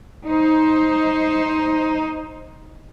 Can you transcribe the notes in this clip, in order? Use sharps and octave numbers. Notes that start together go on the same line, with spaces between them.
D#4 C5